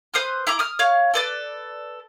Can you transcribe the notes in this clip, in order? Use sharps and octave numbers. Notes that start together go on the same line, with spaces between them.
B4 C5 D#6 F6
E4 A#5 D6
D#6 F6
C#5 F5
A4 B4 D5